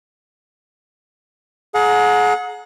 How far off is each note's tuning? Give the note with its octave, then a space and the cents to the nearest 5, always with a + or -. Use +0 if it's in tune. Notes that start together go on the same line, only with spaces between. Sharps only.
G#4 +30 F#5 -25 A#5 +0